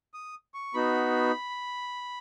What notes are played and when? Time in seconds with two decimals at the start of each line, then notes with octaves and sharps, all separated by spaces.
0.14 D#6
0.54 C#6
0.74 B3 D#4 F#4 B5